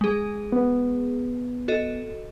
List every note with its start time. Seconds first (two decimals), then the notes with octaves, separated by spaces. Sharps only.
0.01 G#3 G#4
0.52 B3
1.68 F#4 A4 D#5